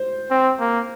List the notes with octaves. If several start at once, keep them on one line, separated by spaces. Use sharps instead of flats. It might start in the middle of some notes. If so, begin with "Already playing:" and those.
Already playing: C5
C4
A#3